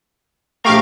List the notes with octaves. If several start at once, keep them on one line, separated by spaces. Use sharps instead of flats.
A#1 A3 G4 F5 A#5 C#6 D7